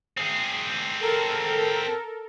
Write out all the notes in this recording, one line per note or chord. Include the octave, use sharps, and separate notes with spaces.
C4 G#4
A4 A#4